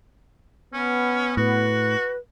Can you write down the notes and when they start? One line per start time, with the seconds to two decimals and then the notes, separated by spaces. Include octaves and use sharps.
0.74 B3 C#4
1.37 A2 F#4 B4